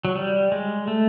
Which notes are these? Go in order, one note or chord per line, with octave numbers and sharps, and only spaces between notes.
F#3
G3
G#3
A3